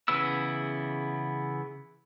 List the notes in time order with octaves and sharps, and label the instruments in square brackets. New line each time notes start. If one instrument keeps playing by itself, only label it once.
[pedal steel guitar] C#3 E3 B3 E4 E6